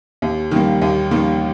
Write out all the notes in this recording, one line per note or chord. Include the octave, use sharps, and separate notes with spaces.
D#2
D#3 G3 A#3
D#2
D#3 G3 A#3